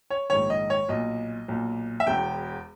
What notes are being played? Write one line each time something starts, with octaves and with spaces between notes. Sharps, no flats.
C#5
A#1 G#2 D#3 C#5
D#5
C#5
B1 A#2 D#5
B1 A#2
E5
E1 E2 B2 G5